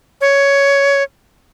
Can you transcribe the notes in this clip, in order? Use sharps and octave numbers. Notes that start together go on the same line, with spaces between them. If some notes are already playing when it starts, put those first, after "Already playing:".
C#5